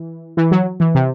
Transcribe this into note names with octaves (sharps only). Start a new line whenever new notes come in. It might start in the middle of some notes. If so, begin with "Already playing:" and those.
Already playing: E3
E3
F#3
E3
C3